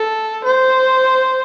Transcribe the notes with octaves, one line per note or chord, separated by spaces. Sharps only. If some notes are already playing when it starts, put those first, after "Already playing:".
Already playing: A4
C5